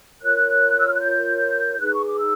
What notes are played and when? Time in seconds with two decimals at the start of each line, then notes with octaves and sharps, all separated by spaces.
0.23 F4 A#4 C#5 F#6
0.79 E6
0.87 F6
0.93 F#6
1.01 G6
1.80 D#4 G#4 B4 F#6
1.93 C#6
2.05 D6
2.19 E6